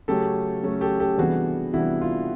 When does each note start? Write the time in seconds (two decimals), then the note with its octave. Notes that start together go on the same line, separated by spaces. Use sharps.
0.08 C#3 F#3 A3 C#4 G4 A4
0.63 C#3 F#3 A3 C#4
0.81 G4 A4
1.00 G4 A4
1.18 C3 E3 G3 B3 D4 F#4 G#4
1.74 C3 E3 G3 B3 D4 E4 F#4
2.01 F4